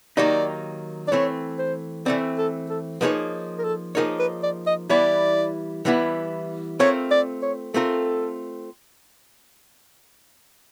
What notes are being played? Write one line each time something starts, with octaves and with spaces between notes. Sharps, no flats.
D#3 F#3 A#3 D#4 G4 D5
D5
E3 A3 C4 C#5
C5
E3 A3 C4 D5
A4
A4
F3 A#3 D#4 G#4 B4 C#5
A#4
A4
F3 A#3 D#4 G#4 A#4 C#5
B4
D5
D#5
E3 G3 B3 E4 D5
E3 G3 B3 E4
A3 C4 F4 A#4 C#5
D5
C#5
A3 C4 F4 A4 A#4